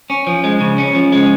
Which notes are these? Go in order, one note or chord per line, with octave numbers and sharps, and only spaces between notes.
C#4
F3
G#3
C#3
C#4
F3
G#3